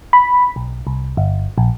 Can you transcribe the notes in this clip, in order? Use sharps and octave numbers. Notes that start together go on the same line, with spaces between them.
B5
B1
C2
G1
A#1